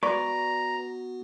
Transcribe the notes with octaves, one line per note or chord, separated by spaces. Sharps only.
B3 F#4 B4 D5 A#5 C#6